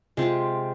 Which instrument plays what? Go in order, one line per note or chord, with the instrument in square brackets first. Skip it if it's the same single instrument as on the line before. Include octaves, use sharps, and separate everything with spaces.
[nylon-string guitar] C3 [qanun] G#3 C4 F4